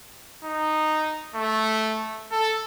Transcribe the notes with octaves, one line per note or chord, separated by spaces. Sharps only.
D#4
A3
A4